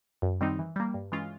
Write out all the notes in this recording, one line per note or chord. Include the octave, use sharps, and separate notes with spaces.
F#2
D#3 G3 C4 D#4
E3
G3 A#3
G2
E3 G#3 C#4 F4